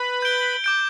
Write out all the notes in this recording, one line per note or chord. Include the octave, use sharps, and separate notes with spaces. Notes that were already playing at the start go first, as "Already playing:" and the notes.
Already playing: B4 B5
G6 D7 G7
D6 G6 D7